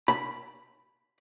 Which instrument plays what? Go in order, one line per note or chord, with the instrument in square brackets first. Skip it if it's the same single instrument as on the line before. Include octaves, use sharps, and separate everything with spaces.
[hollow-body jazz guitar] B5